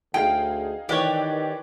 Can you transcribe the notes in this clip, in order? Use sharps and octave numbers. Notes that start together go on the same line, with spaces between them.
D2 D#4 G#4 F5 G5
D#3 E3 G4 C#5 D5 F#6